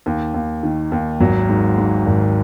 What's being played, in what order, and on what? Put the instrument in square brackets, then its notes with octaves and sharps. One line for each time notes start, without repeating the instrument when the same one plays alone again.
[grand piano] D#2
D#2
D#3
D#2
G#1 F#3
G#2
G#2
G#1